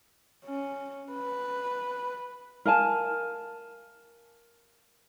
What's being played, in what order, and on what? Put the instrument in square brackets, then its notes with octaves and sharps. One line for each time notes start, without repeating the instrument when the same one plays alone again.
[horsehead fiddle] C#4
B4
[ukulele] A#4 F5 G#5 A5